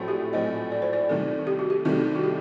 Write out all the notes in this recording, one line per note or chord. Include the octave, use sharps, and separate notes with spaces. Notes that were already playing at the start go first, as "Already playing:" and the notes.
Already playing: A#1 A2 F#3 A3 C4
G4
A#1 A2 F#3 A3 C4 D#5
D5
C5
D5
C2 C3 D#3 A3 A4
G4
F#4
G4
C2 C3 D#3 A3 F#4
F#4
G4